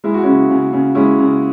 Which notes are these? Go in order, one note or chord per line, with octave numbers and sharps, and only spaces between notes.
G#3 E4
F#4
C#3 C#4 E4
C#3
C#3
G#3 C#4 E4
C#3